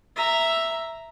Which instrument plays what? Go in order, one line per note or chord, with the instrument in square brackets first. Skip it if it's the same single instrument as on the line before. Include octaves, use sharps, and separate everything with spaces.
[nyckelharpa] E5 A#5